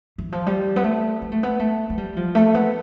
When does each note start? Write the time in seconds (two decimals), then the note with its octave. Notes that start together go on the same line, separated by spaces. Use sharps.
0.18 E3
0.32 F3
0.47 G3
0.76 B3
0.84 A3
1.22 B3
1.32 A3
1.43 B3
1.60 A3
1.90 A3
1.98 G3
2.17 F3
2.35 A3
2.54 B3